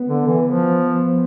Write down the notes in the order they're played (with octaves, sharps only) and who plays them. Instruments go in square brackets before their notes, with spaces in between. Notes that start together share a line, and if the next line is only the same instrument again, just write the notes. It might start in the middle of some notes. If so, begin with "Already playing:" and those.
Already playing: [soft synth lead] B3
[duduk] D3
E3
F3